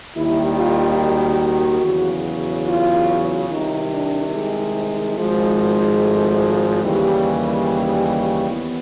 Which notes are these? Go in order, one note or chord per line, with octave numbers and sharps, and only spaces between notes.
D#2 D#3 G3 E4
F4
F#4
E2 C#3 F#3
F4
C2 C3 D#3 D#4
D4
G#3
G#1 G#2 F3 G#3
A3
D#2 C#3 E3 G3
E3 B3